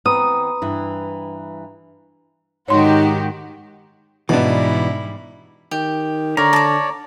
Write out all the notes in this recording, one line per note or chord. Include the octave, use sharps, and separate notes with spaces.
E3 B3 C4 B4 A#5 B5 D#6
G2 E3 E4
G#2 D#3 D#4 F#4 G4 C#5 C6
G#2 B2 E3 G3 D4 E4
D#3 G4
D3 A#4 C#5 D5 A#5
A5 D6